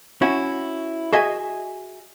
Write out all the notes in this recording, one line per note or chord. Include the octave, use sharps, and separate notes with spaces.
C#4 E4 F#4
F#4 G#4 D#5 E5 G#5